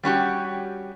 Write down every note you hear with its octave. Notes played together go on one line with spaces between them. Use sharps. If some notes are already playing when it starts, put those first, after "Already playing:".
G3 C#4 F#4 G4